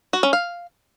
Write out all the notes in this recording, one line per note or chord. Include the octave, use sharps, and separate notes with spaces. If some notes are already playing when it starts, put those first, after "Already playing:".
F#4
C#4
F5